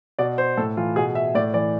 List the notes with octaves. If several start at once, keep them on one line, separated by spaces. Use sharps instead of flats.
B2 D5
C5
A2 A4
E3 F4
B2 G#4
E5
A2 D5
E3 D5